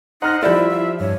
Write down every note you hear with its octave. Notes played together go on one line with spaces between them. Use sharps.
D#4 C5 D#5 F#5 A#5 F6 A#6
F3 G3 E4 C5 D5 E5 B5
F5
G2 C#5